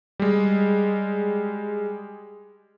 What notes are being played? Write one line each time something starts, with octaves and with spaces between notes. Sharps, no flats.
G3 G#3